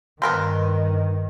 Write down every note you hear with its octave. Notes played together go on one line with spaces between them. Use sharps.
G2 D#3 B3 A#4 C5